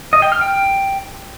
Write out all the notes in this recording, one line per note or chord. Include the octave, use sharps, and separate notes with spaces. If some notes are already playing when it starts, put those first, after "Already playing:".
D#5
G5
F6
G5